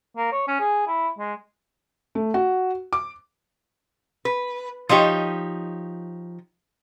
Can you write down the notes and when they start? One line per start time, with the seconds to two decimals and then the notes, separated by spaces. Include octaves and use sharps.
0.17 A#3
0.32 C#5
0.48 C#4
0.60 G#4
0.87 E4
1.19 G#3
2.15 A3
2.34 F#4
2.93 D6
4.25 B4
4.89 F3 D4 D#4 G4 C#5